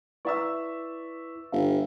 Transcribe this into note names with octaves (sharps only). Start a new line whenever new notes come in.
E4 B4 D5 E5 C#6 E6
G1 E5 F5